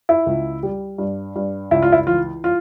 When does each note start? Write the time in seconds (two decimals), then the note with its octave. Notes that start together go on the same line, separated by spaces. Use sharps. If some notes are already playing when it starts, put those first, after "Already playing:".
0.09 E4
0.26 C#2
0.63 G3
0.98 G2
1.36 G2
1.71 C#2 E4
1.82 F4
1.92 E4
2.07 E3 F4
2.44 F4